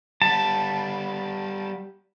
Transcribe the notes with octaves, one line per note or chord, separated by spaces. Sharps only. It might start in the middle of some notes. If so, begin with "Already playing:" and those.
G3 B3 A5